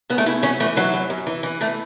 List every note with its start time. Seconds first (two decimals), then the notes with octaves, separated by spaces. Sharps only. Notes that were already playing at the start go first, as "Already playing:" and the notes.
0.10 C#3 B3
0.18 A3
0.26 C#3 E4
0.43 F#2 C#4
0.60 E3 A3
0.76 E3 F#3
0.94 F#2
1.10 F#2
1.27 E3
1.43 E3
1.61 E3 A3